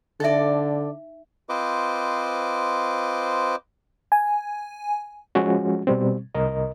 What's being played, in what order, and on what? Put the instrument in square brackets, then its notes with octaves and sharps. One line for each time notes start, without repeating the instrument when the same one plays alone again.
[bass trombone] D3 [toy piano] D#4 E5 [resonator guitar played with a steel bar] A4 D5
[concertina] C4 F4 B4 C5 D#5 D6
[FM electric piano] G#5
[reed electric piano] F3 G#3 C#4 F#4
B2 G3 C4
C2 A#4 D#5